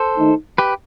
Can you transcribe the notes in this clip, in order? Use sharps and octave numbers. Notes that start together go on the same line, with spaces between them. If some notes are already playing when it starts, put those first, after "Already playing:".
Already playing: A4 C5
D#3 A3 D#4
G4 B4